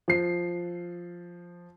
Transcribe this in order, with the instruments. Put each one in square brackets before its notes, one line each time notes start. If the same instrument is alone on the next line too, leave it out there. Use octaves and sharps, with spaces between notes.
[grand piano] F3 C7